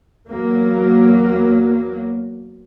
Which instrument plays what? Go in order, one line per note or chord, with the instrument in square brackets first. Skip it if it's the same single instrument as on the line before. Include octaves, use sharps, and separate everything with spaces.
[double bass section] E2 F#3 A#3